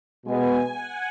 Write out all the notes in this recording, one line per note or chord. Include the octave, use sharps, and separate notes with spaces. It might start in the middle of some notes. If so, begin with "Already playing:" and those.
B2 G#3 B3 G#5
F#5